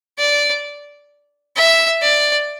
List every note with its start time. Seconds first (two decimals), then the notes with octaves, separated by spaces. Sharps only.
0.19 D5
1.56 E5
2.02 D5